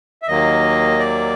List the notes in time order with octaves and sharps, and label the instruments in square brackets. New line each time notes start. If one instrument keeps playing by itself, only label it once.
[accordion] E5
D#2 D#3 F#3 A#3 D#5
D5